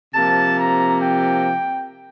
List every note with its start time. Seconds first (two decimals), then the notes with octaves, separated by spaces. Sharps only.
0.14 C3 F3 A#3 A5
0.58 A#5
1.01 G5